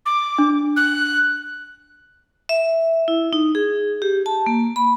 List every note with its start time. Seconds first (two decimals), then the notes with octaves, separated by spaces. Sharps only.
0.06 D6
0.38 D4
0.77 F#6
2.49 E5
3.08 E4
3.33 D#4
3.55 G#4
4.02 G4
4.26 A5
4.46 A#3
4.76 B5